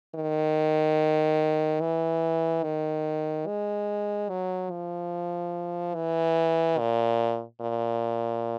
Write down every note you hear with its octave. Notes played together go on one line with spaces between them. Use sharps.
D#3
E3
D#3
G#3
F#3
F3
E3
A#2
A#2